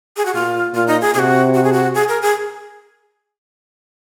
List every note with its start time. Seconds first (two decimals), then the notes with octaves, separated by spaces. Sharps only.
0.17 G#4
0.25 F#4
0.34 A#2 F4
0.74 A#2 F4
0.87 D#4
1.01 G#4
1.14 C3 F#4 G#4
1.54 F#4
1.64 G#4
1.73 F#4
1.95 G#4
2.08 A#4
2.22 G#4